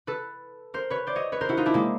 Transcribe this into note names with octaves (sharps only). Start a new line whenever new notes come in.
A4 B4
A#4 C5
B4 C#5
C5 D5
C#5 D#5
B4 C#5
A#4 C5
E4 F#4
D#4 F4
D4 E4
G#3 A#3